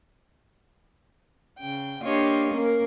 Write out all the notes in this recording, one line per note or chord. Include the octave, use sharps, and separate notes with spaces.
C#3 G5
A#3 D4 F4 G4 C#5 D#5
A#3 C#4 A#4